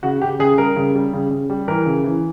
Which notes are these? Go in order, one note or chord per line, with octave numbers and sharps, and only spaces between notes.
C#3 F#4
C#3 G4
C#3 G#4
G3 A#4
C#3
G3
C#3
C#3
G3
E3 A#4
C#3
E3